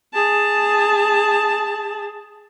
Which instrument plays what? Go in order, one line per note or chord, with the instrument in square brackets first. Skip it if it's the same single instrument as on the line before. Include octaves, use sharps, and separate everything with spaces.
[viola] G#4 A5